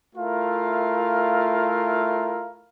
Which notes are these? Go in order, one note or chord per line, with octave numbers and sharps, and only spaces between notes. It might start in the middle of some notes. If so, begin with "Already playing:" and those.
A3 E4 F4 A#4 F5